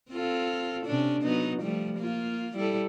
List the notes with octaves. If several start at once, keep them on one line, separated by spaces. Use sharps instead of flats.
C4 F4 A4
C3 C#4 D4
F#3 B3 D#4
F3 G3 A3
A#3 F4
G3 E4 A4